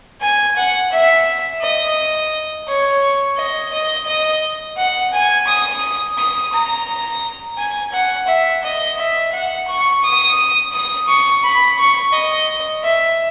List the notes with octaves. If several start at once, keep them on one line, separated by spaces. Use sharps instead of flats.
G#5
F#5
E5
D#5
C#5
D#5
D#5
D#5
F#5
G#5
D#6
D#6
A#5
G#5
F#5
E5
D#5
E5
F#5
C#6
D#6
D#6
C#6
B5
C#6
D#5
E5